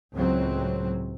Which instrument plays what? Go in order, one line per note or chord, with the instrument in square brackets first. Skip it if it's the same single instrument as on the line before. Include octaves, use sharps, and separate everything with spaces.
[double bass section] C#2 A2 F#3 C4